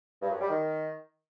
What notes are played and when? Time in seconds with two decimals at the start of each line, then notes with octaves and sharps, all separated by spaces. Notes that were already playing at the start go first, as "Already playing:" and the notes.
0.22 G2
0.31 F#2
0.40 G3
0.50 D#3